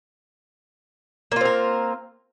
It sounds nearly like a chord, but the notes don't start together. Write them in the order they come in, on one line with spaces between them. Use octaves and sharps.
A#3 F4 C4 A#4